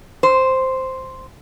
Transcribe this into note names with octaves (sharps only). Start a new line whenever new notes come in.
C5